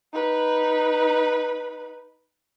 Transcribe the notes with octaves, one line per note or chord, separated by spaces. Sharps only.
D#4 B4